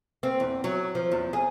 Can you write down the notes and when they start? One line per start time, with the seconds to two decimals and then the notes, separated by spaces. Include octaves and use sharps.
0.23 C4
0.40 E2
0.64 F#3
0.95 F3
1.12 E2
1.33 G#4